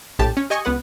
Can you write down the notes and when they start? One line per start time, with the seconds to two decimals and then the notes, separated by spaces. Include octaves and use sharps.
0.19 A#1 A2 G4 A5
0.37 C#4
0.50 G4 D#5 G#5 C#6
0.65 C#2 B3 B4 F#5